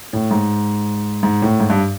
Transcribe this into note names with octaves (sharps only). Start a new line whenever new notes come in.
A2
G#2
G#2
A2
G#2
G2